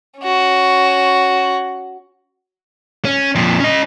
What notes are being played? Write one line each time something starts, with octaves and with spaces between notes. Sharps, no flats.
C#4 F#4
C#4
F2 A#2
C#4 D#5